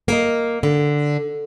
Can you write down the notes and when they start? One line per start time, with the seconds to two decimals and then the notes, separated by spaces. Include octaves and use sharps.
0.08 A#3 A#4 D#5
0.63 D3